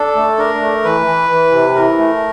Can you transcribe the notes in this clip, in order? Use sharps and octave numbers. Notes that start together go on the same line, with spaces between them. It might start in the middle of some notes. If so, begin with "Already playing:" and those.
Already playing: D4 A4
A3
D4 A#4
A3
E3 B4
E3
E3
C3
E3 A#4
A3